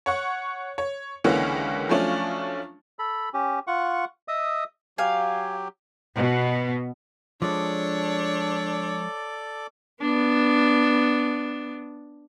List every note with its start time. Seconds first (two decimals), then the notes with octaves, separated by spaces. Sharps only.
0.06 C#5 F#5 C#6
0.78 C#5
1.24 C#2 D3 E3 A#3 C#4
1.89 F3 F#3 A3 C#4 D4 F4
2.99 A4 B5
3.34 C#4 G4
3.67 F4 F#5 C#6
4.28 D#5 E5 D#6
4.98 F#3 G4 F5 G#5
6.15 B2
7.42 F3 G#3 D4 A4 C#5 D5 D6
10.01 B3 D4